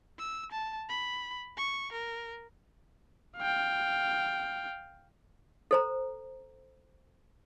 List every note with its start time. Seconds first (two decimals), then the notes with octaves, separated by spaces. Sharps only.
0.19 E6
0.52 A5
0.89 B5
1.57 C#6
1.92 A#4
3.37 F5 G5
5.71 A4 C5 A#5